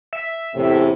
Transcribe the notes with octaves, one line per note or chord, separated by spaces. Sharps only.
E5
E2 A2 C3